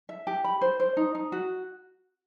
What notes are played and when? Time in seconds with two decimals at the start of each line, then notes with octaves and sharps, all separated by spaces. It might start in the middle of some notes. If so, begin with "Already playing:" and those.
0.09 E5
0.27 G4
0.44 B5
0.61 C5
0.80 C5
0.97 D#4
1.15 D#4
1.32 F#4